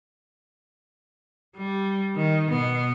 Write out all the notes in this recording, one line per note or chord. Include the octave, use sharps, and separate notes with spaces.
G3
D#3
B2 B3